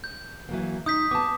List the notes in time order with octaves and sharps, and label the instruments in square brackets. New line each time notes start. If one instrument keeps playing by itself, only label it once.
[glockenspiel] G6
[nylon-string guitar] E3 F#3 A#3
[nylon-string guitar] D#4 [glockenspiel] D#6 G6 B6
[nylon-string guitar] B3 A5 [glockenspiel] D6